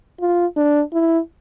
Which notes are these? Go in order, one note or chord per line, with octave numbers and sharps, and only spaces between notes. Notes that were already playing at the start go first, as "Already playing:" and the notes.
F4
D4
E4